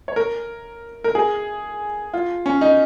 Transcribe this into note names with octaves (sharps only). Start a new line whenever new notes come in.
C#5
A#4
A#4
G#4
F4
C#4
D#4